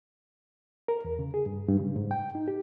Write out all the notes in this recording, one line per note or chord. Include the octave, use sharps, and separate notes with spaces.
A#4
E2
C#3
G#4
G2
G2
C#3
G#2
G5
D#4
G4